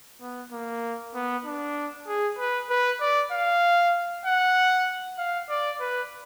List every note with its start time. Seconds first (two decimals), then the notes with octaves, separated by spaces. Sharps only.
0.21 B3
0.52 A#3
1.15 B3
1.46 D4
2.08 G#4
2.39 B4
2.70 B4
3.01 D5
3.32 F5
4.26 F#5
5.19 F5
5.50 D5
5.81 B4